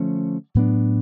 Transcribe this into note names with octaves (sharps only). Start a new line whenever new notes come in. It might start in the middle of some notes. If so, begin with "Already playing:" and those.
Already playing: D3 F3 A3 C#4
A2 F#3 B3 D4